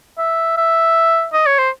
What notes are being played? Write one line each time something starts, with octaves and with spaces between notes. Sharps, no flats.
E5
E5
D#5
C#5
C5